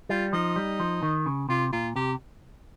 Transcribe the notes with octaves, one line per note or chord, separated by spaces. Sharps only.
G3 F4
F3 D#4
G3
F3
D#3
C#3
C3 F4
A#2 F4
C3 G4